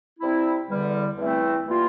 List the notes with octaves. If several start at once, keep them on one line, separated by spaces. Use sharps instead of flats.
C3 G3 C4 E4
E2 D3 G3
E2 E3 A3 C4 E4
E3 G3 A#3 F4